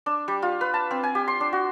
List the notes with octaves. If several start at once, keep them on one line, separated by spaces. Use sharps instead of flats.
D4
G3
F4
B4
A5
C4
G#5
G4
C6
D4
F#4